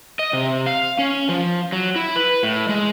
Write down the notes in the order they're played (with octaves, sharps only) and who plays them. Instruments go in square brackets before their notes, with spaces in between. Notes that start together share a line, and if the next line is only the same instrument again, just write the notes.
[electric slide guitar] D#5
C3
F5
C#4
F3
F#3
E4
B4
A2
G#3